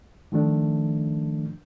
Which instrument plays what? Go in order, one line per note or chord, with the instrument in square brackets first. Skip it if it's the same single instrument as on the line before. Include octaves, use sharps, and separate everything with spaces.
[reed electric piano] D#3 F3 A3 D4